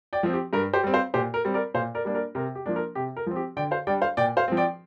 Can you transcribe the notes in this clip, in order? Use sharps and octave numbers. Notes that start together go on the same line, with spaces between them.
D5 G5
F3 C4
G4
G2 A#4
G4 C5
G3 C4
C5 F5
A#2 G4 C5
A#4
G3 C4
A#4 D5
A#2 C5 F5
A#4 D5
G3 A#3 D4
A#4 D5
C3 A#4
G4
F3 A#3 D4
A#4
C3 G4
A#4
F3 C4
G4
D3 D5 G5
C5 F5
G3 D4 D5 G5
C5 F5
A#2 D5 G5
C5 F5
F3 C4
D5 G5